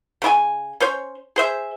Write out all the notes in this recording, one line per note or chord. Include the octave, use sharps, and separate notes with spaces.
C#3 E4 G#5
C#4 C5 C#5
G#4 C5 E5